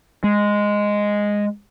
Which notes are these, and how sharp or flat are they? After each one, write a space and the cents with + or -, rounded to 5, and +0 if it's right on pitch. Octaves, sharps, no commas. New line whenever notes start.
G#3 -5